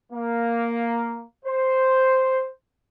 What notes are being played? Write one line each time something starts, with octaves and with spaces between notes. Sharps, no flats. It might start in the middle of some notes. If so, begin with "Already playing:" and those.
A#3
C5